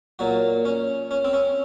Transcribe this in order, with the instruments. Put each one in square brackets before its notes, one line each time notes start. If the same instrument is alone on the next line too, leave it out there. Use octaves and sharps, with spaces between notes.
[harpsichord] A#2 F#3 F#4
C#4
C#4
C4
C#4